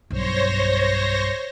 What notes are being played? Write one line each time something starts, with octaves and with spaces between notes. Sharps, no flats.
B1 G2 C5 C#5 A#6